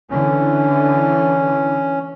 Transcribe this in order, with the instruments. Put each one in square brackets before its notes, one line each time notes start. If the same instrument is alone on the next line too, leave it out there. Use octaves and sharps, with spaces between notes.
[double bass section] D3 E3 [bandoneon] C#4